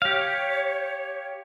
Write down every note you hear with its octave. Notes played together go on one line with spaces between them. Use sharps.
G4 C#5 F5